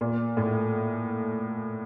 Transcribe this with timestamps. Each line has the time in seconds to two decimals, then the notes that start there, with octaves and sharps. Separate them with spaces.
0.01 A#2
0.37 A2